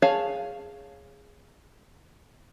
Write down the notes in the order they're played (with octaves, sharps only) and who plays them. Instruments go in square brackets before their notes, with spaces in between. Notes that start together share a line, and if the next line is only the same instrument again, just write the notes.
[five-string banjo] G#4 C#5 F5 A5